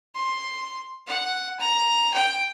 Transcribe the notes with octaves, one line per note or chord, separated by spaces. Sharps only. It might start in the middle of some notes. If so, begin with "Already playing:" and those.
C6
F#5
A#5
G5